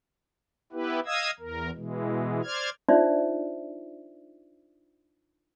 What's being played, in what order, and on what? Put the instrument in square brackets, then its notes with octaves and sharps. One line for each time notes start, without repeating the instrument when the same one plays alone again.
[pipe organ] B3 E4 G4 B4
D#5 F5 D#6 E6 G#6
E2 A#4
B2 E3 G#3
C5 D5 F6 G#6
[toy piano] D4 D#4 F4 C5 D5 E5